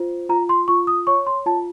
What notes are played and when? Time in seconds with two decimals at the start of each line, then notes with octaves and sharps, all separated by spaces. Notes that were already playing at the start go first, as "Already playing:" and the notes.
Already playing: F4 C5
0.29 F4 A#5
0.49 C6
0.68 F4 C#6
0.87 D#6
1.07 C#5 C#6
1.27 C6
1.46 F4 A5